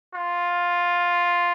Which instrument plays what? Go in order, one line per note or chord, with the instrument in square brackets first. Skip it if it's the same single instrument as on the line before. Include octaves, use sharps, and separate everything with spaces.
[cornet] F4